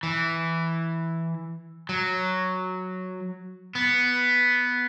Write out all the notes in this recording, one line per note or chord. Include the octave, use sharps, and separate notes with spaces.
E3
F#3
B3